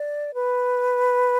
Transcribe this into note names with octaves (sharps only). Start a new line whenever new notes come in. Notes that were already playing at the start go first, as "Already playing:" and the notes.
Already playing: D5
B4